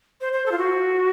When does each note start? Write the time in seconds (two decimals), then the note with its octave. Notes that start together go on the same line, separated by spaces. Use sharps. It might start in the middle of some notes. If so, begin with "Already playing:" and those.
0.21 C5
0.33 C5
0.46 A4
0.52 F4
0.58 F#4